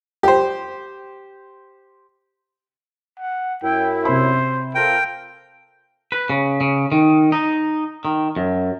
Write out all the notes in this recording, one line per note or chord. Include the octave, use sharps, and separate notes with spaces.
G4 C5
F#5
F#2 E4 G5
C3 C5 B5
C4 F4 A4 A#4 G5
B4
C#3
C#3
D#3
D#4
D#3
F#2